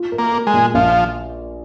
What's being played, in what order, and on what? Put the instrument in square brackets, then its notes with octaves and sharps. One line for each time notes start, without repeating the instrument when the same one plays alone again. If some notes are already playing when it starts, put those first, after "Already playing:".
Already playing: [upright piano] F4
A#4
[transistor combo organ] A#3
[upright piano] A#4
[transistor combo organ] G#3
[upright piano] A#2
[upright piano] A#1 [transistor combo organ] F3